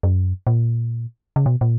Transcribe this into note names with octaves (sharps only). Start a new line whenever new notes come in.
F#2
A#2
C#3
B2
A#2